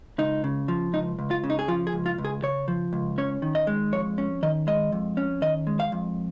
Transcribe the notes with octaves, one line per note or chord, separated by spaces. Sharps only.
C#2 D#4
C#3
F3
C#2 D#4
C#2
F4
C#3
D#4
G#4
F3 F4
G#4
C#2
F4
C#2
G#4
C#3 C#5
F3
C#2
C#4 C#5
D#3
D#5
G#3
F2 C#5
C#4
D#3 D#5
G#3 D#5
F2
C#4
D#3 D#5
G#3
F5
F2